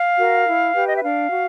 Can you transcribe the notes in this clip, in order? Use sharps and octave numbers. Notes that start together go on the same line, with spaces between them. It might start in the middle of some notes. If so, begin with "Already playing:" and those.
Already playing: F5
F#4 A#4
E4
G4 B4
D#5
E5
D4 F5
F#4